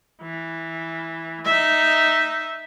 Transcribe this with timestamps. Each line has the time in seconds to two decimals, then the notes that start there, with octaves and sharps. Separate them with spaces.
0.22 E3
1.45 D#4 E5